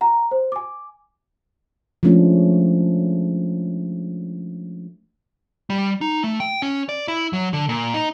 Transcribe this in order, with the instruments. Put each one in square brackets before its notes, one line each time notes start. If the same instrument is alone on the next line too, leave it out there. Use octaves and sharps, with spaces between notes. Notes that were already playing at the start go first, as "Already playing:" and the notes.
[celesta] F#5 A#5
C5
G#5 D6
[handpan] F3 G#3 A3 C#4 D4 F4
[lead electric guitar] G3
D#4
A3
G5
C#4
D5
E4
F#3
D3
A#2
D#4